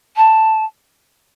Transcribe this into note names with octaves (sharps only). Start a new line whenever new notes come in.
A5